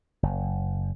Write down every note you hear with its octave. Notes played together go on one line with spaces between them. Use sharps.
F#1